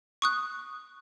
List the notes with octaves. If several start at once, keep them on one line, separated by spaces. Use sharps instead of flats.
C#6 D#6 F#6